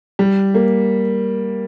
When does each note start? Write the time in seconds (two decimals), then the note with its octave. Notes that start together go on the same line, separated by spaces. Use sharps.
0.19 G3
0.54 A#3